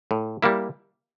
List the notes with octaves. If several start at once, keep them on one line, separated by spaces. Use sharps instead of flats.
A2
G3 A#3 E4